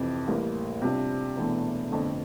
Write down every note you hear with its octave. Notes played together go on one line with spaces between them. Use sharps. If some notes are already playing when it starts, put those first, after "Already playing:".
Already playing: F1 F2 C3 E3
A1 A2 G3 A#3
C3 G3 D4 F4
E1 E2 E3 A3 D4
G1 F2 D3 F3 A3